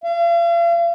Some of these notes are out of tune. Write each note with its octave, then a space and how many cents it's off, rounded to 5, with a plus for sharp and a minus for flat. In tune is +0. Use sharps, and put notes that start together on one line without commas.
F5 -40